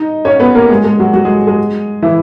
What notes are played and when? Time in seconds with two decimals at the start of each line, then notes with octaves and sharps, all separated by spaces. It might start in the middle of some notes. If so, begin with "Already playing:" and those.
Already playing: D#4 D#5
0.25 C#4 C#5
0.40 B3 B4
0.55 A#3 A#4
0.69 G#3 G#4
0.84 G#3 G#4
1.00 F#3 F#4
1.13 F#3 F#4
1.25 G#3 G#4
1.47 G#3 G#4
2.02 E3 E4